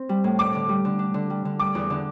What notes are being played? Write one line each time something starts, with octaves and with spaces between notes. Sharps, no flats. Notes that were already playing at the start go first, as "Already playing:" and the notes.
Already playing: C4
G3
A2
D4 D6
D3
G3
D3
D4
D3
G3
D3
G3 D6
E2
D3